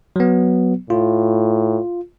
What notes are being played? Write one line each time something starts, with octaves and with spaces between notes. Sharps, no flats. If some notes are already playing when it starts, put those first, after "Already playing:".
F#3 B3
A2 F4